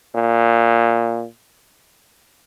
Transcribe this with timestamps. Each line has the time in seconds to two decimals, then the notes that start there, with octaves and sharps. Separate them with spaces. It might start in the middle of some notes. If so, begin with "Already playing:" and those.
0.15 A#2